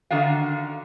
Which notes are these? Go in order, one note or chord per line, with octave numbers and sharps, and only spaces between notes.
D3 D#3 F#4 F5